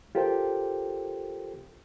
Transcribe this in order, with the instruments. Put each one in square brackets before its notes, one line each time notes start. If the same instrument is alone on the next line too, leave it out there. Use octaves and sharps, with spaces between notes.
[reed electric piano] F4 G4 A4 A#4 C5 G5